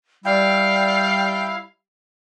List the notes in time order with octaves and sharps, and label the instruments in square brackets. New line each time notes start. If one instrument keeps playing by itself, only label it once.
[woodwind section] G3 [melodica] E4 [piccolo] F5 [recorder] G5